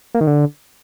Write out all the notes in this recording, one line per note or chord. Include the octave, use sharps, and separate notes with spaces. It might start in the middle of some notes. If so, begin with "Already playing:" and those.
A#3
D#3
D3